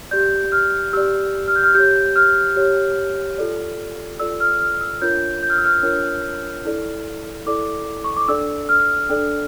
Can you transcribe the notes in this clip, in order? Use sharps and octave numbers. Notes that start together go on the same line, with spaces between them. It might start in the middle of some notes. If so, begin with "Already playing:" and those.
G4 D5 G6
F6
G4 D5 E6
F6
G6
F6
G4 C#5 G6
F6
G4 C#5
F4 A4 D5
F4 A4 D5 E6
F6
F6
E6
D4 F4 A#4 C#5 G6
G6
F6
E6
F6
D4 F4 A#4 C#5
E4 A4 D5
E4 A4 D5 D6
C#6
D6
D4 A4 D5 E6
F6
D4 A4 D5